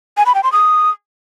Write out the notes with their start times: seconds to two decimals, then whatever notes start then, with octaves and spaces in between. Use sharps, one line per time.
0.17 G#5
0.26 B5
0.35 G5
0.44 C6
0.52 D#6